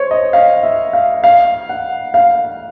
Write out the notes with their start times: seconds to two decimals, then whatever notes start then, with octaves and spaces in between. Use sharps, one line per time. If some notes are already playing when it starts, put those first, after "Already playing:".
Already playing: C5 C#5
0.11 D#5
0.33 F5
0.63 E5
0.93 F5
1.24 F5
1.69 F#5
2.14 F5